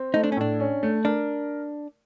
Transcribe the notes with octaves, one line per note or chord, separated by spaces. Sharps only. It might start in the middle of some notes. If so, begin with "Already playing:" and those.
Already playing: C4
A3 D#4
D4
C#4
A2 D4
C#4
A3
D4 A#4